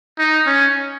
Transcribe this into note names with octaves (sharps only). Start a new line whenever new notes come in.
D#4
C#4